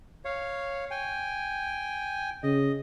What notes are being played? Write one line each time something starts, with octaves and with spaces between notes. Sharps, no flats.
C#5 F5
G5 G#5
C#3 D#5